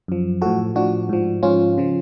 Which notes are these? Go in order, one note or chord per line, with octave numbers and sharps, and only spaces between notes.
F#2 F3
A2 F3 F#4 A4
A2 F3 D4 F#4
G#2 F3
G#2 F3 C#4 F4
C#3 F3